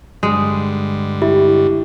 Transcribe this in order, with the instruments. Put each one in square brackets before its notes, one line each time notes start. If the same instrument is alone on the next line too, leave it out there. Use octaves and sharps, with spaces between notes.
[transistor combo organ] G2 D3 [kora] G#3
[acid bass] E4 [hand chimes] G4